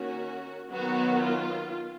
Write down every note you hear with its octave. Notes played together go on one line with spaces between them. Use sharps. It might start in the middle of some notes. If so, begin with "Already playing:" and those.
Already playing: D#3 A#3 C#4 F#4
D#3 F#3 B3 F#4
F4